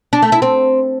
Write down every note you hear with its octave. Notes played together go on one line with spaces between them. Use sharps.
D4
A3
E4
C4